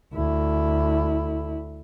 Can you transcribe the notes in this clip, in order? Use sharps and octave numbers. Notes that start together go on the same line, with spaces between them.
D2 E4